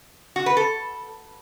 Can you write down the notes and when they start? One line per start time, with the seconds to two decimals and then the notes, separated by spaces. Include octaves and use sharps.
0.36 F#4
0.46 B4
0.57 A4